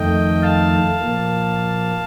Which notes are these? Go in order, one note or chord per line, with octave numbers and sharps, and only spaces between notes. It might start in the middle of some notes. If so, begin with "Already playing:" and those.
Already playing: F2 D#3 A3 D#5 G5
F5 A5
A#2 F3 A#3